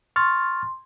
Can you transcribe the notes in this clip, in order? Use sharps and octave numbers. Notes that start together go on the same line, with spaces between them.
C6 C#6 F6 A6